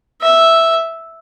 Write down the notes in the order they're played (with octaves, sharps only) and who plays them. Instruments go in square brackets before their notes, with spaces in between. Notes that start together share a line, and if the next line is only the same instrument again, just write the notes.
[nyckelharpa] E5